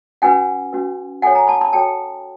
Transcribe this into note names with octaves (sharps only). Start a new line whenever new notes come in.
C#4 F#4 B4 F#5 G#5
C#4 F#4 B4
F#4 A4 C#5 F#5 G#5
G#5 A#5
A5 B5
A5 B5
F#4 A4 C#5 G5 A5